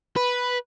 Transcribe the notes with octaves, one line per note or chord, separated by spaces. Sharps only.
B4